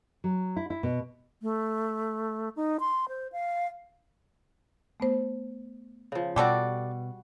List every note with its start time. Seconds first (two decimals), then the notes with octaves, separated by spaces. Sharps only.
0.24 F#3
0.56 E4
0.70 E4
0.83 B2
1.42 A3
2.56 D#4
2.80 C6
3.09 C5
3.32 F5
5.00 A3 B3 C5
6.12 C#3 F3
6.36 B2 G3 F#4 G4 A4 D5